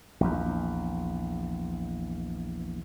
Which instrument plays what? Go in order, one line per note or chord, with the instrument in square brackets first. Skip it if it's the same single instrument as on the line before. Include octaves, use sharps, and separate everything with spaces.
[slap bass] A#1 E2